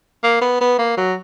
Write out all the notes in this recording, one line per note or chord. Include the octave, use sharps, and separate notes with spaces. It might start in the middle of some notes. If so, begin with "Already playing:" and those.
A#3
B3
B3
A#3
F#3